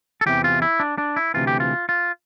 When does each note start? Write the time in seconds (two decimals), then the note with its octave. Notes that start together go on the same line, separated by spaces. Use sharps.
0.21 A4
0.26 E2 C3 E3 G4
0.44 F4
0.62 E4
0.80 D4
0.98 D4
1.16 E4
1.34 D2 C3 E3 F4
1.47 G4
1.60 F4
1.89 F4